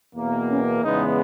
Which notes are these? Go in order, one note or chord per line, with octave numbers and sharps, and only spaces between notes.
E2 B2 A#3
C#4
E2 C#3 G#3 B3 D#4